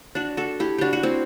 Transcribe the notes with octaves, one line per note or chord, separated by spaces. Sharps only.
D4 F#4
F#4 A4
E4 G4
D4 F#4 G4
F#4
C4 E4